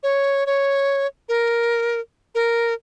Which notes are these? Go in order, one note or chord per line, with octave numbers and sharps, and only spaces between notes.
C#5
C#5
A#4
A#4